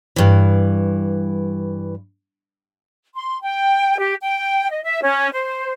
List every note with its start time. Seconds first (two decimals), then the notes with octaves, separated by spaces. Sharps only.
0.16 G2 E3
3.15 C6
3.43 G5
3.97 G4
4.23 G5
4.70 D#5
4.84 E5
5.03 C#4
5.32 C5